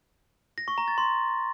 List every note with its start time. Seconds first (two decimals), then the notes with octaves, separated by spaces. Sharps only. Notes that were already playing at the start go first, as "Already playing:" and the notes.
0.58 A#6
0.68 C#6
0.78 A#5
0.88 A6
0.98 C6